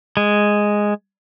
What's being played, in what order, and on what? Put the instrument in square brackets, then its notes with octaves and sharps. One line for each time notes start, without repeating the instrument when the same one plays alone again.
[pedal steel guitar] G#3